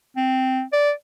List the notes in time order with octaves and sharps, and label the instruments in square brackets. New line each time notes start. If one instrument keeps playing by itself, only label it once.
[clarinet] C4
D5